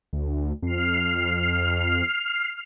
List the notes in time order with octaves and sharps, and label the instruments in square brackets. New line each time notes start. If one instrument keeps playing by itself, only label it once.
[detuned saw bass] D2
[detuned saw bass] F2 [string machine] F6 C7